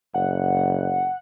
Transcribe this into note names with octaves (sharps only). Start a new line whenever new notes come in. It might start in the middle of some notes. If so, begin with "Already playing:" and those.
F#1 F#5